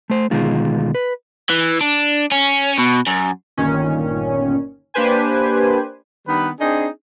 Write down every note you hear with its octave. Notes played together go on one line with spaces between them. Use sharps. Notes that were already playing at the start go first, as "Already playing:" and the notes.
A3 C5
D2 B2 D#3 G#3 F4
B4
E3
D4
C#4
B2
F#2
G1 A#2 D#3 C#4
A#3 D4 G4 B4 C5 G#5
D#3 G3 B3 D4 B4
C4 D4 D#4 G#4